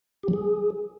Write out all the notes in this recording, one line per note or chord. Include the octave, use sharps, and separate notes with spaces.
G4
F#3
G#4